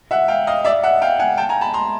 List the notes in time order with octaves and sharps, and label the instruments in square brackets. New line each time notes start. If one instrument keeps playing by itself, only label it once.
[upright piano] E5 F#5
F5 G5
D#5 F5
D5 E5
E5 F#5
F5 G5
F#5 G#5
G5 A5
G#5 A#5
A5 B5
A#5 C6